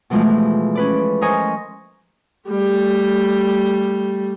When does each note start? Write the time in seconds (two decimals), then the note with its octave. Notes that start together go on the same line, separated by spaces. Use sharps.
0.10 B2 E3 F3 G#3 A3
0.75 C#4 B4 D5
1.21 A#4 C5 D#5 G#5 C#6
2.49 G3 A3